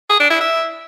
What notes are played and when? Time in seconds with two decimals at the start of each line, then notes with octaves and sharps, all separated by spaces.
0.10 G#4
0.20 D4
0.30 E4
0.41 E5